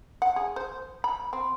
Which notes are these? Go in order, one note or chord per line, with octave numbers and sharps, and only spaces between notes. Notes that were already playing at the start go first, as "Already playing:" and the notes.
F#5
G#4
C5
B5
C4